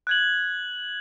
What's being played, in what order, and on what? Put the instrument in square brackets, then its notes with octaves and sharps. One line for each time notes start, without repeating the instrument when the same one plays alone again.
[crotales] F#6 G#6 F#7